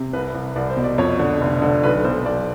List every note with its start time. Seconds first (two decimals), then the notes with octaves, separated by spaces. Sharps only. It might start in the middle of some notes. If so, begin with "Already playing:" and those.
Already playing: C3
0.13 C2 B4
0.34 C2
0.56 C2 D5
0.70 C5
0.77 B2
0.84 D5
0.98 F2 C#5
1.19 D3
1.41 F1
1.62 D3
1.83 B1 B4
2.04 B1 C5
2.26 B1 D5